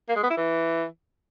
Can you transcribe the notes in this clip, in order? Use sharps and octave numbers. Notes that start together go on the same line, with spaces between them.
A#3
G#3
B3
E4
E3